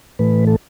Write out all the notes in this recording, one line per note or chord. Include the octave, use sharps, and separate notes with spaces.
A2 E3 A3 B4
A4